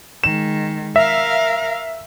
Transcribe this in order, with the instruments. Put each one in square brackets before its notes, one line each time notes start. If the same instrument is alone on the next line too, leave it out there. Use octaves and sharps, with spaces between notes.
[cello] D#3 G#3 [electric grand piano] E7
[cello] A#4 F5 [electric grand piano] E5